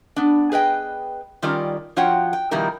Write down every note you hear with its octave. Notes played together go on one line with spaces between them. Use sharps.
B3 D4
G#4 B4 D#5 G5
D#3 G3 C#4 F4 A#4 D5
F3 F4 F#4 C#5 F#5 G5
G5
B2 D#3 F3 G3 E4 A#4